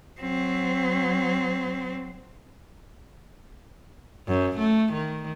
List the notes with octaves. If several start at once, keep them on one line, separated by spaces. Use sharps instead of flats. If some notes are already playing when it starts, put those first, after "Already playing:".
F#3 C4
F#2
A3
D#3